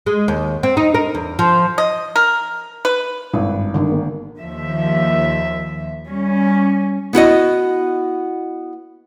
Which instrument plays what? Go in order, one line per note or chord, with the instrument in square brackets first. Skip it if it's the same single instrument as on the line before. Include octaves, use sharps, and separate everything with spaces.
[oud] G#3
D#2
C4
D#4
A#4
E2
F3
[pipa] D#5
A#4
B4
[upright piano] G#1 [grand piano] G2 [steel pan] E4
[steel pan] D3 D#3
[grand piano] A#3
[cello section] D#2 F3 E5
G3 C#4
[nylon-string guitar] B3 E4 F#4 D#5